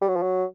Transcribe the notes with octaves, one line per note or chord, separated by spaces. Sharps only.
G3
F#3
F3
F#3